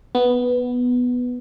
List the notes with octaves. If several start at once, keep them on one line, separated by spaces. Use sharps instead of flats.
B3